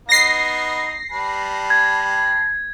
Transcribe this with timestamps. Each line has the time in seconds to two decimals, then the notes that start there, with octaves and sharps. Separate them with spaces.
0.09 B3 D#4 A#6 C7
1.12 G3 B4 A5
1.70 G#6